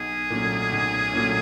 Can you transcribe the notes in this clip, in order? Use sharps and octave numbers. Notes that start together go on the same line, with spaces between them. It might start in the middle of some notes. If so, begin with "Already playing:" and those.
Already playing: B1 G#4
A#2 F#3 A3 C#4
B1
A#2 F#3 A3 C#4